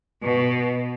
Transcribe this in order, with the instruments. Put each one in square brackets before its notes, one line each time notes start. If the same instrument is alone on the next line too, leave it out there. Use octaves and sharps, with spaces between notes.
[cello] B2